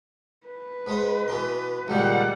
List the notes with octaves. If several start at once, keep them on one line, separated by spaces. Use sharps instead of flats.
B4
G#2 G#3 C5
B2 E3 C6
C#2 A#2 D#3 G3 F#5